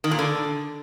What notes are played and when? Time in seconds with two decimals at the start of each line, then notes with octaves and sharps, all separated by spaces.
0.04 D#3
0.11 A#2
0.19 D3